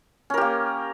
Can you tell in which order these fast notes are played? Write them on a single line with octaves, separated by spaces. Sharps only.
C#4 A#4 G4 A#3